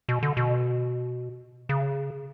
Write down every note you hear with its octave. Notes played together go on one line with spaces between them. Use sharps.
B2
D3
B2
C#3